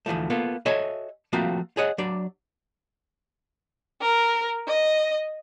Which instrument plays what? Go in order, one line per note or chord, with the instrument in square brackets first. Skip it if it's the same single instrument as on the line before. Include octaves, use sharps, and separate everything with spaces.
[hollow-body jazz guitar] D2 E3 F3 A3
A#3 B3 F4 A4
F#4 A4 C#5 D#5 E5 G#5
F3 A3 A#3 C4 F4 F#4
G#4 C#5 D#5 F#5
F#3 D4 D5
[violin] A#4
D#5